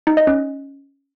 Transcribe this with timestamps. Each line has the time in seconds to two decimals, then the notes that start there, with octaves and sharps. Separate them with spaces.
0.07 D#4
0.17 D#5
0.27 C#4